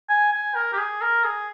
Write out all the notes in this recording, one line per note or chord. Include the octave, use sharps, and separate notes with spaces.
G#5
G#5
A#4
G4
G#4
A#4
G#4